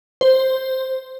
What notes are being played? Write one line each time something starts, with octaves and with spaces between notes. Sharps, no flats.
C5